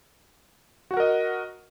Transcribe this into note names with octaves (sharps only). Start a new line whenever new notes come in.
F#4 A#4 D#5 F#5